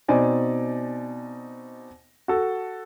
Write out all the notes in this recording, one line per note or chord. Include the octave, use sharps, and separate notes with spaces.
B2 C4 D#4 D5 G#5
F#4 A4